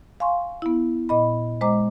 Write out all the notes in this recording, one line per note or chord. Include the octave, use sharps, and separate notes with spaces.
F5 G#5 C6 C#6
B3 E4
A#2 D#5 B5
G#3 C5 D#5 A#5 D6